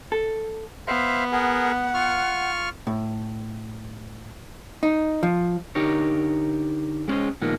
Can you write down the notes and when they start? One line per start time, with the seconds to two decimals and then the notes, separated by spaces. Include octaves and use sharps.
0.12 A4
0.88 B3 C5 E5 F5
1.32 G#4 A#4 F#5
1.94 F4 C#6 F6
2.87 A2
4.83 D#4
5.23 F3
5.75 D3 D#4 G4 A#4 C#5
7.08 G#3 B3 C#4 G#4 C5 D#5
7.41 A#2 D#3 F3 G#3 A#3 B3